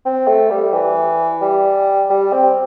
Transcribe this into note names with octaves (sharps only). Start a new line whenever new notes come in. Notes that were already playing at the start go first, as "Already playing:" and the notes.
C4
A3
G3
E3
G3
G3
C4